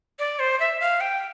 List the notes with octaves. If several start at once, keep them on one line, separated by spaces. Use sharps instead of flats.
D5
C5
E5
F5
G5